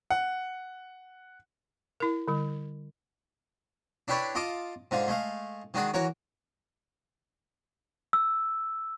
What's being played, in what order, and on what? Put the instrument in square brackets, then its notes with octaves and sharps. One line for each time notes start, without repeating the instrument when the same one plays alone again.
[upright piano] F#5
[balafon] E4 A#4
D3 G3
[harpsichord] D4 E4 G4 B4 C#5 D5
F4 D#5 A5 D6 D#6
G#2 D3 F4
G#3 A3 F5
D#3 G#3 D4 F#4 G#4
E3 F#4 A#4 C#5
[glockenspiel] E6